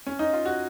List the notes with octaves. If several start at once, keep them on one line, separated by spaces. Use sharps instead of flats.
C#4
D#4
F4
F#4